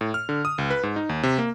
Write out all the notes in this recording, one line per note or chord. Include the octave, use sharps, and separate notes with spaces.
A2
F6
D3
D#6
C#2
B4
G#2
D#4
D#2
C3
A#3